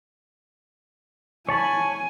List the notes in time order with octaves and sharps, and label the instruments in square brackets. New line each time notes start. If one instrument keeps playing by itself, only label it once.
[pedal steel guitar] C#5 A5 B5 [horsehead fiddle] G#5